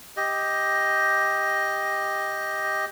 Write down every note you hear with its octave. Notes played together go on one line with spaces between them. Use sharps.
G4 D#5